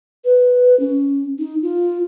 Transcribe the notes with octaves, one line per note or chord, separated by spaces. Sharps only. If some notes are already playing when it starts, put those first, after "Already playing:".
B4
C#4
D#4
F4